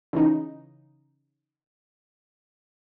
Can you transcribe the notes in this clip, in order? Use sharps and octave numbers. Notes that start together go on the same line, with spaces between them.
C#3 E3 D#4